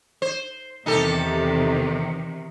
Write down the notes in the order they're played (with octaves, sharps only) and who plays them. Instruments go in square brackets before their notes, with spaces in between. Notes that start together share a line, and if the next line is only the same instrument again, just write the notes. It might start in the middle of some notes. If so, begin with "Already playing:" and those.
[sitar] C5
[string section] E2 C3 D#3 [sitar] D#4 G4 A4